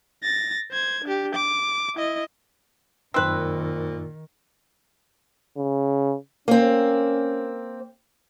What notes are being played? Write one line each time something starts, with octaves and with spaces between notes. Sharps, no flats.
A6 A#6
C5 G#6
D4 G4
D6
E4 D#5
F#2 A#2 D#3 C4 D#4 B4 E6
C#3
A#3 C4 C#4